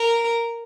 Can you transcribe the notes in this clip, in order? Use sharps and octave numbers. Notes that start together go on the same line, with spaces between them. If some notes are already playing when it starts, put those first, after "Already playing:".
Already playing: A#4